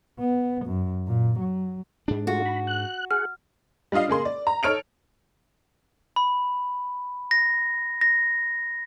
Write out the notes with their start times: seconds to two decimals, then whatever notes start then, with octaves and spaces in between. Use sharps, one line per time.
0.20 B3
0.66 F#2
1.07 A#2
1.39 F#3
2.08 G#2 G#3 D4
2.27 G#3 A3 F4 F#4
2.46 B5
2.67 F#6
3.11 G#4 F#5 F6
3.92 G3 D4 F4 D#5 F5
4.08 C#3 A#3 G#4 C6
4.25 D5
4.47 A#5
4.63 D#4 A4 C#5 F6 D7 F7
6.16 B5
7.31 A#6
8.01 A#6